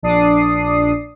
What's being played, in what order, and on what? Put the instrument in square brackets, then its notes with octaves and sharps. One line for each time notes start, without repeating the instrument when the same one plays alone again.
[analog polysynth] A#1 D4 D5 D#6 C7